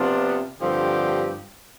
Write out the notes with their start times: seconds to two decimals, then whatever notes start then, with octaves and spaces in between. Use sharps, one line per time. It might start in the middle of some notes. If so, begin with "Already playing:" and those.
Already playing: C3 F3 B3 D4 F4
0.61 G2 D3 F3 C4 G4